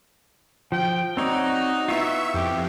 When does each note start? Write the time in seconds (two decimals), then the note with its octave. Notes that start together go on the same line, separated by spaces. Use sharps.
0.72 F3 G5
1.17 C4 D#4 F#4 C#5 D5
1.88 B3 E4 F4 E5 C#6
2.34 F2 G4